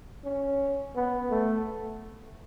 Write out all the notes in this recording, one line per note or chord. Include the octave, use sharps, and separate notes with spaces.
C#4
B3
A3